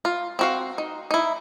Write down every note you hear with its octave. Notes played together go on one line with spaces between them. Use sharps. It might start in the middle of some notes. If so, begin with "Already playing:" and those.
F4
C4 F#4 F5
D#4
D#4 E4